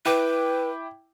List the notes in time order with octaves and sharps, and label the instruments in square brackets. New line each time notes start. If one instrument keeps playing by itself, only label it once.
[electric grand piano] E4 G5 D6 [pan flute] B4